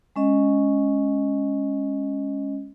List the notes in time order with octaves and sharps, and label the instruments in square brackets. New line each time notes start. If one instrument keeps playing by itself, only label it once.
[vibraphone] G#3 C#4 D#5